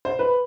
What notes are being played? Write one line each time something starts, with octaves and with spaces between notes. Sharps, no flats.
C5
B4